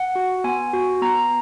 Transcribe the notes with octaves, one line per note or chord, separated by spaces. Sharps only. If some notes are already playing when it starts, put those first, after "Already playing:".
Already playing: F#5
F#4
B3 G#5
F#4
B3 A#5